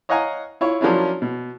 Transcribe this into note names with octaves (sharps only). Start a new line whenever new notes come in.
C#5 D#5 F5 F#5 G#5 A#5
E4 F4 C#5
F3 F#3 A#3 C#4 D4 E4
B2